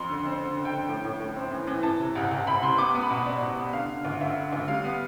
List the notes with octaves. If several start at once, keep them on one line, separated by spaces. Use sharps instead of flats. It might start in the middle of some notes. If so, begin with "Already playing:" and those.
Already playing: F2 C6
D3
C4
D3
D3
G5
D3
A2
A2
A2
C4
E3
E3
E3 A5
C3
C2
C2
C2 B5
C3 C6
B3 D6
B3
B5
B2
B3 D5
B2
B3
D3 F5
D3
D2
D2 E5
D3
D2
G3 F5
B3